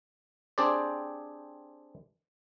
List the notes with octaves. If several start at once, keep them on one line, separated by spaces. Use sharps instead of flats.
C4 D4 G4 G#4 C5 D5